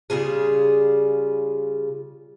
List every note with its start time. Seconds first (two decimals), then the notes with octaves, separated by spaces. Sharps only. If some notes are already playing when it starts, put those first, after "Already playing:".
0.10 C#3 G3 F4 G#4